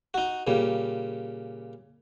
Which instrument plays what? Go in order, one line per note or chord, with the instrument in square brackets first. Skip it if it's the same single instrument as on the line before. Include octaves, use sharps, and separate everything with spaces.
[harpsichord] D#4 F#4
A#2 C#3 G3